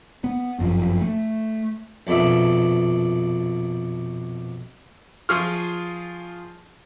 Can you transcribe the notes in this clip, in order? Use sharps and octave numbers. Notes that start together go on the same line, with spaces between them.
B3
G1 F#2 F3
A3
A#1 F2 B2 D4 E5
F3 F4 G#4 C#6 F6